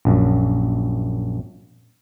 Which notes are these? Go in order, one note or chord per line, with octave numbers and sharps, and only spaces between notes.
A#1 F#2